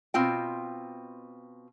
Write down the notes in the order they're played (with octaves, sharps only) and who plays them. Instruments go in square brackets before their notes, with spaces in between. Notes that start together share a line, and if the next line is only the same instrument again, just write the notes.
[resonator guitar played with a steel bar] B2 C4 F4 G5